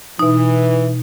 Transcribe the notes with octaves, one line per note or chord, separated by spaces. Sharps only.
B2 E3 D#4